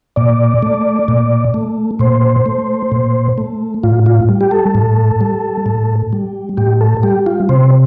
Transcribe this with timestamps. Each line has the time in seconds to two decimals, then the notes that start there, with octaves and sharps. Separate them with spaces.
0.16 A#2 D5
0.62 A3
1.08 A#2
1.54 A3
1.99 A#2 C5
2.46 A3
2.92 A#2
3.38 A3
3.83 A2 F4
4.06 F4
4.29 G3
4.41 G4
4.51 A4
4.75 A2
5.21 G3
5.66 A2
6.13 G3
6.57 A2 G4
6.81 A4
7.03 G3 G4
7.26 F4
7.49 C3 C5